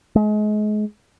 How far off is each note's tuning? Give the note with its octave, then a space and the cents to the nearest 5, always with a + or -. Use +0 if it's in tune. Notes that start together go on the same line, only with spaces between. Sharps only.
G#3 +30